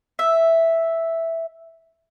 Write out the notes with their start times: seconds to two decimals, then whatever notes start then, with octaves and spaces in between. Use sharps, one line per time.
0.19 E5